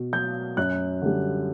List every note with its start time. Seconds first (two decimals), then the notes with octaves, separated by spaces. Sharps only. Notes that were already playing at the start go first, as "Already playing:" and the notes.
Already playing: B2
0.13 F#3 G6
0.57 F#2 F#6
1.02 D3 G3